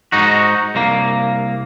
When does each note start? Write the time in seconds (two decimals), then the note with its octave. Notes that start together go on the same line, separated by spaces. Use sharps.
0.12 G#2 D#4 F#4
0.75 C2 A#3